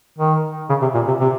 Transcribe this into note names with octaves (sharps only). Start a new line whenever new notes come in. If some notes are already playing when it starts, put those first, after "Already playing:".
D#3
C#3
C3
A#2
C3
C3